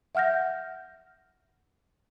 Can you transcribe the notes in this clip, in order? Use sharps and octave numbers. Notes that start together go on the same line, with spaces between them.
E5 F#5 F6 G6 A#6